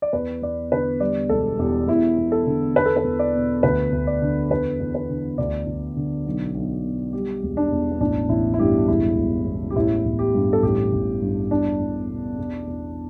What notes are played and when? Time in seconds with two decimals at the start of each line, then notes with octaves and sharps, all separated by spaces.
0.02 D5
0.13 E2 B4
0.42 E2 D5
0.72 D3 B4
1.00 G3 D5
1.29 E1 A4
1.59 E2 G4
1.88 E2 E4
2.18 E2
2.32 A4
2.47 D3
2.76 E2 B4
2.85 A4
2.96 B4
3.04 E2
3.19 D5
3.34 B2
3.63 D2 B4
3.92 D2
4.07 D5
4.22 D3
4.50 E2 B4
4.80 E2
4.95 B4
5.10 D3
5.38 D2 D5
5.67 D2
5.96 D3
6.26 B1
6.55 B1
6.84 B2
7.13 G3 G4
7.43 E1
7.57 D4
7.72 E2
7.91 B3
8.00 A1 D4
8.29 A1 E4
8.54 E4
8.59 G2 G4
8.88 E1 E4
9.18 E1
9.46 E2
9.70 G4
9.76 A1 E4
10.05 A1
10.19 G4
10.34 G2
10.53 A4
10.63 A1 G4
10.92 A1
11.22 G2
11.51 E2 D4
11.80 E2
12.09 B2
12.38 E2
12.67 E2